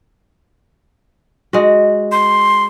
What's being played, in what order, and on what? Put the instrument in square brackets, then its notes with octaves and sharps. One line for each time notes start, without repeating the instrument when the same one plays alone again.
[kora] G#3 F#4
[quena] C6